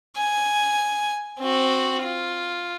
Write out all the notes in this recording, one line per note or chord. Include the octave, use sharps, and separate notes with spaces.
G#5
C4 F#4
F4